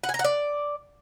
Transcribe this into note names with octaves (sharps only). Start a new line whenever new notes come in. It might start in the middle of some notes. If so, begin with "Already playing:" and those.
F#5
G#5
A#5
F#5
D5